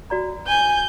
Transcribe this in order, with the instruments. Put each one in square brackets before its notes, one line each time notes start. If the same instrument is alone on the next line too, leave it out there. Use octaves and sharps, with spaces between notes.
[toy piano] F#4 D5 A#5
[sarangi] G#5 [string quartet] G6